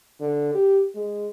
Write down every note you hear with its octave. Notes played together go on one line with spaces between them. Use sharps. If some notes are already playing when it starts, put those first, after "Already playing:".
D3
G4
G#3